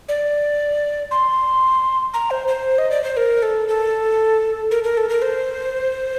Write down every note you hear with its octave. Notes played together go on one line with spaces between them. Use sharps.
D5
C6
A#5
C5
C5
D#5
D5
C5
A#4
A4
A4
A#4
A#4
A4
A#4
C5